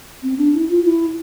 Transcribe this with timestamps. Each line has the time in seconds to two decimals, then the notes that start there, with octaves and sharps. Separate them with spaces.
0.23 C4
0.38 D4
0.54 E4
0.69 F4
0.85 E4